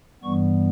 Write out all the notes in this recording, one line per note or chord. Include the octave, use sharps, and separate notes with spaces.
G2 E3 G3 B3 C#6